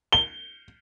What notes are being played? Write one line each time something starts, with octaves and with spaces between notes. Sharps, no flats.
G7